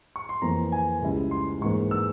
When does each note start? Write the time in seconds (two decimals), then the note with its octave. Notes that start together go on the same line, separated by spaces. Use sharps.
0.16 C#6
0.29 C6
0.42 F2 E3 A#3 A#5
0.72 G#5
1.02 C#2 C#3 G3 C#4 E4
1.31 C6
1.61 G#2 E3 A#3 C#6
1.91 E6